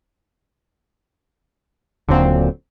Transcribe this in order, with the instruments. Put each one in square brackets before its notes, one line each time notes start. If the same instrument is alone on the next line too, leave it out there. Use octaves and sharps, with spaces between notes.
[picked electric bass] D#1 A#2 [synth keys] D3 F#3 C4